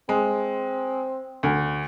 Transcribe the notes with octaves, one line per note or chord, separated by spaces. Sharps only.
G#3 C4
D2